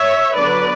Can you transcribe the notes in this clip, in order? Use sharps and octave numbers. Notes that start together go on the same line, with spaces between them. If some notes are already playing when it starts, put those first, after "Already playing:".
Already playing: C#5 E5
D3 F#3 B3 D4 B4 D5